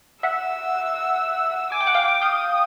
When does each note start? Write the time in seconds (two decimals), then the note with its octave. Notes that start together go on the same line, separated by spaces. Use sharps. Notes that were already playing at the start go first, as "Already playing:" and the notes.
0.23 E5 F#5 E6
1.72 G#5 D6
1.80 G5
1.87 F#5
1.94 F5 G5
2.21 F5 G5 D#6